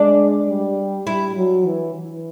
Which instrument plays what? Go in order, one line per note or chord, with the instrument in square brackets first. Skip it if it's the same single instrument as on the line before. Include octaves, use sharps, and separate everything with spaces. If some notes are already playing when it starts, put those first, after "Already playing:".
Already playing: [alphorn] G#3 [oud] D4
[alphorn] G3
[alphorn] G3 [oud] E4
[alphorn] F#3
E3
E3